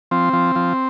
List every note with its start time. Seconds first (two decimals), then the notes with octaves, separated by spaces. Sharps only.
0.11 F3 C4
0.33 F3
0.56 F3